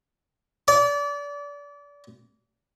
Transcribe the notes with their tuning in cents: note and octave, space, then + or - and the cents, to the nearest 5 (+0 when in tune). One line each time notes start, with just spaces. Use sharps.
D5 -30